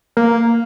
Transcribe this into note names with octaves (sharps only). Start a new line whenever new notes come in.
A#3